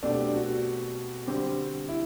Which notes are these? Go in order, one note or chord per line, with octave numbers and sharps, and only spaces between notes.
B2 A3 C4 D4 G4
F#4
D3 G3 C4 G4 C5
E4